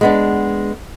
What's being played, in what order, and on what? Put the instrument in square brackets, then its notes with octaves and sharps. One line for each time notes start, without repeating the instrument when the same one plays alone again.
[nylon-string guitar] G#3 B3 D4